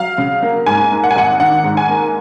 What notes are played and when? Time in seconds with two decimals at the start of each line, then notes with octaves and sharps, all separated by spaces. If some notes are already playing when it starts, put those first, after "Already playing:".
Already playing: F#3 F5
0.18 C#3
0.42 A#3
0.66 G#2 G#5
0.91 A#3
1.04 F#5
1.11 G#5
1.16 G#1 F#5
1.40 D#3 F#5
1.64 G#2
1.77 G#5
1.89 A#3